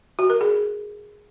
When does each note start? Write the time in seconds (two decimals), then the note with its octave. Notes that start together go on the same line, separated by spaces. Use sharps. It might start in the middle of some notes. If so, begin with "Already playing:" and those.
0.19 F#4
0.30 A#4
0.41 G#4